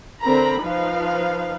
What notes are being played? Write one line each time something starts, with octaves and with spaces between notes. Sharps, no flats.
D3 C4 A#4 A#5 B5
F3 D#4 B4 F5